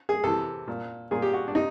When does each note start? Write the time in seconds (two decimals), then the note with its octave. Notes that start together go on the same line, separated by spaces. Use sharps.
0.09 G#4
0.24 C3 E3 A4
0.68 A#2
1.11 A#2 G#4
1.22 G4
1.33 F#4
1.48 D4
1.55 C3 D#4